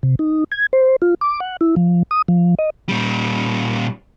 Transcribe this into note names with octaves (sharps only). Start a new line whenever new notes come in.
C3
D#4
G#6
C5
F4
D6
F#5
E4
F3
D#6
F3
D#5
A#2 G3